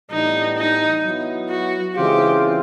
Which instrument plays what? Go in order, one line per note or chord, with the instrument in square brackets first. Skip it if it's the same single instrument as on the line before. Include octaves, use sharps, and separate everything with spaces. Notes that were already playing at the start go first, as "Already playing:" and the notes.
[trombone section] A2 E3 G3 B3 D4 [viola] D#4
[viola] D#4
[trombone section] F#3 B3 E4
[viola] F#4
[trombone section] C#3 E3 G#3 C4 F4 [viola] G4